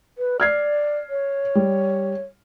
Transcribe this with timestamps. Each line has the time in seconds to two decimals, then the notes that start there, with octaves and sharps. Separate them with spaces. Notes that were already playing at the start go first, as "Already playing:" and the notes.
0.18 B4
0.40 D5 F6 G#6 C7
1.10 C#5
1.55 G3